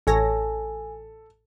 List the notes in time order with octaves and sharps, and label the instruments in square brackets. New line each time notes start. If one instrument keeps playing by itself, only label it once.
[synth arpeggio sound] A1 C#5 A#6 [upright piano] A4 [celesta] G#5